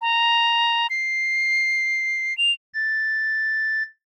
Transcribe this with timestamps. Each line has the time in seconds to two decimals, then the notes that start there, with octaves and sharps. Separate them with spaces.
0.01 A#5
0.90 C7
2.38 F7
2.74 A6